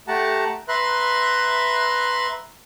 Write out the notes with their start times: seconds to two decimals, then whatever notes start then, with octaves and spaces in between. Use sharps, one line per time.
0.08 A3 G4 F#5 A5 A#5
0.68 B4 E5 A#5 C6 F#6